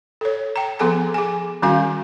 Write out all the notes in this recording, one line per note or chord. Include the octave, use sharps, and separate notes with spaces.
A4 C#5
G5 A#5
F3 B3 G#4 A4 G#5 A#5
G#4 G#5
D#3 G3 C#4 F#4 F5 G#5